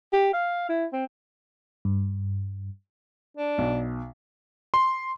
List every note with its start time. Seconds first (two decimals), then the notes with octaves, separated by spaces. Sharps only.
0.13 G4
0.34 F5
0.69 E4
0.93 C4
1.85 G2
3.37 D4
3.58 B1
4.74 C6